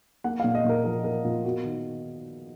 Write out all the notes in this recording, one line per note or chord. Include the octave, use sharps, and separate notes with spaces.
A#3 F#5
F5
A#2
D#5
A#2 A#4
F3 A#4
A#3 A#4
A#2 F4
B3 F#4
D#3